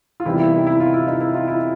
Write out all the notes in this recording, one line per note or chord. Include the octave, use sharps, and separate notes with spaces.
F4
E2 C3 D#3 G3 C4 E4
E4
D#4
E4
F4
E4
D#4
E4
F4
E4